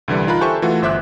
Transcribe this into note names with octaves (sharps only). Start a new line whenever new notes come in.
C2 D3 E3 G3
D#4 F4 A#4 B5 F#6
G4 A4 C5 E5 G#5 C#6
E3 A3 F4 F#4
G1 C5 E5 D6 F#6